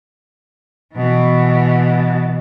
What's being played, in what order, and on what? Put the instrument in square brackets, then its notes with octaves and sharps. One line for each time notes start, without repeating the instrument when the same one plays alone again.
[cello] B2 E3